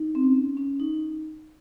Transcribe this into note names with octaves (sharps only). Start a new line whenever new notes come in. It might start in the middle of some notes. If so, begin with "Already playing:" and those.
Already playing: D#4
C4
C#4
C#4
D#4